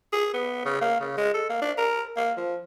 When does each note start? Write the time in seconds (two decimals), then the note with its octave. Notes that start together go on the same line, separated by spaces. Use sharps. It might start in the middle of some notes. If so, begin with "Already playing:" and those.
0.13 G#4
0.34 B3
0.65 C#3
0.81 A#3
1.00 C#3
1.17 G#3
1.34 A4
1.50 A#3
1.62 D4
1.78 A#4
2.17 A#3
2.37 F3